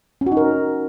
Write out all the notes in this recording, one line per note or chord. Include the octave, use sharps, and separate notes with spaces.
C#4
F#4
D#4
A#4